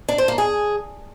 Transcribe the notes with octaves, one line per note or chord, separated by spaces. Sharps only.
D4
C5
A#3
G#4